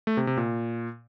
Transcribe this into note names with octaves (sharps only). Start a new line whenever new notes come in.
A3
C3
C3
A#2